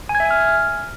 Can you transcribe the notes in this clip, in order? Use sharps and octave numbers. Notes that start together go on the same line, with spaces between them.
G#5
G#6
E5
G#5
F6